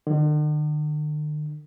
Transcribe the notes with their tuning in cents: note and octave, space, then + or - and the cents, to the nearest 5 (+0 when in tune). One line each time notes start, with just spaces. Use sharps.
D3 +45